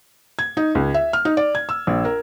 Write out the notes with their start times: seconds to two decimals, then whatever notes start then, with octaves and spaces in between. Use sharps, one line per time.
0.39 G#6
0.57 D#4
0.75 C#2
0.94 E5
1.13 F6
1.25 D#4
1.37 D5
1.55 G#6
1.69 E6
1.87 A#1
2.05 A#4